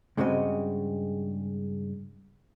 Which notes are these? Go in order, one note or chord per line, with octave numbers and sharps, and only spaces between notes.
G2 C#3 G#3 C4 F#4 D#5